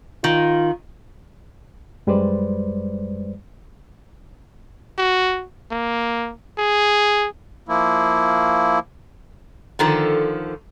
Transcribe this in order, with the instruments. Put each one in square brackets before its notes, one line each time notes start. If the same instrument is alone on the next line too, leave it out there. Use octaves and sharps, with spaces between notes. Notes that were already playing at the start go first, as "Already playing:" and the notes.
[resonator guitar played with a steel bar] D#3 [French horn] F4
[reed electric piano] F#2 G3 G#3 B4 C5 D5
[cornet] F#4
A#3
G#4
[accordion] F3 A#3 E4
[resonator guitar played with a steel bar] D3 D#3 F3 A4